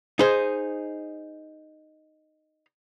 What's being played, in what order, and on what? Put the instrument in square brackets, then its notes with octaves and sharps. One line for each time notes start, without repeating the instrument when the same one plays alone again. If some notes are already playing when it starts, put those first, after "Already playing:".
[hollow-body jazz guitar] D#4 G#4 C5